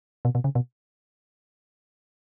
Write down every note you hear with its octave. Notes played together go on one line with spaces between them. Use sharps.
B2
B2
C#3
B2